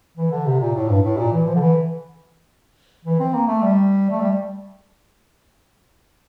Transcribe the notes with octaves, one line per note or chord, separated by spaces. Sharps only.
E3
D3
C3
A#2
A2
G2
A2
A#2
E3
F3
D3
E3
E3
C4
A#3
A3
G3
A3
G3